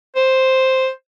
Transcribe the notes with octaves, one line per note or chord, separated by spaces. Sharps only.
C5